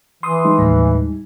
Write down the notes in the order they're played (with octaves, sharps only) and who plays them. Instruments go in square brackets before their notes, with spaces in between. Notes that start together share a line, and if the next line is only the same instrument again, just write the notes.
[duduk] E3 [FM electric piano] C6 D#6
[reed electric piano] G3 G#3 D#4
[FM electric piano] D#2 A2